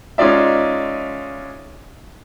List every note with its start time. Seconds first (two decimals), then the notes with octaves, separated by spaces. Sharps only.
0.18 G#3 C#4 D#4 F4 D5 E5